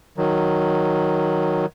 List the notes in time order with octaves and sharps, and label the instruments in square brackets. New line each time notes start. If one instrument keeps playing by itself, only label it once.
[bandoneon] D#3 F#3